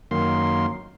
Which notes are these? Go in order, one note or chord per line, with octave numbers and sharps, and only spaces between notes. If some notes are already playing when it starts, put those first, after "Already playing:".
F#2 D#3 A#3 C6